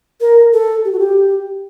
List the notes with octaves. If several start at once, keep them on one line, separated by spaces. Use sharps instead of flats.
A#4
A4
G4
F#4
G4